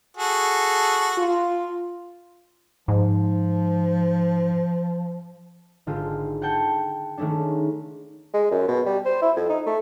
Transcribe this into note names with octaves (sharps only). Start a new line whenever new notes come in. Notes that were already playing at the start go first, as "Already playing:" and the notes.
F#4 G#4 A4
F4
G#2 F3
G#1 D3 G#3 F4 G4
F#5 G5 A5 G6 C#7
D#3 G#3 A3 C#4 D4
G#3
F#2
B2
G3
C5
E4
F2
D#4
A3